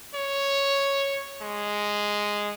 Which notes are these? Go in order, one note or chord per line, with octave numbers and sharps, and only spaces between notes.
C#5
G#3